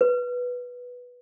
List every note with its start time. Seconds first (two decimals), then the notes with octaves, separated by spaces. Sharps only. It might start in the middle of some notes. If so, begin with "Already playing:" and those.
0.01 B4